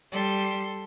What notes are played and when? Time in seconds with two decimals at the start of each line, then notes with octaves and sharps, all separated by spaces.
0.12 G3 A4 C6